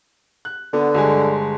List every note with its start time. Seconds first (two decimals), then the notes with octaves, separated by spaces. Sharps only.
0.45 F#6
0.73 D3 B3
0.94 G1 G#3 G#5